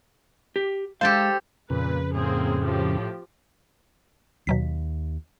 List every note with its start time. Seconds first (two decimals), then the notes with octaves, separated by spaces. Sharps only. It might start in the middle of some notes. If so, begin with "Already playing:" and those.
0.56 G4
1.01 G#3 G4 A4 C5 F5
1.70 F2 A#2 C#3 B4
2.14 A2 A#3 C4 G#4
2.61 F3 G4
4.47 D#2 B2 F#3 B6